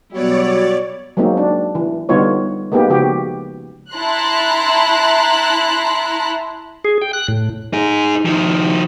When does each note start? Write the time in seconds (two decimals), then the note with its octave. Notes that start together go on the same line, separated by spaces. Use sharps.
0.12 B2 F#3 G3 B3 E4 F#4 C#5 D5
1.17 F#3 G#3 A#3 C4 D#4
1.37 D4
1.75 E3
2.09 D3 G3 B3 D#4 F4 C#5
2.72 G#3 A#3 B3 D#4 G4
2.89 C#3 F3 F#4 G4
3.93 E4 A5 A#5 C6 F#6
6.84 G#4
7.02 G5
7.13 F#6
7.28 A2
7.73 D#4 G#4
8.25 D#3 F3